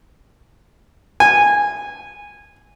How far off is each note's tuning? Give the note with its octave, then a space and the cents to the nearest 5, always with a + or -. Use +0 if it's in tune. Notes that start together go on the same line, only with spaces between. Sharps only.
G#5 -15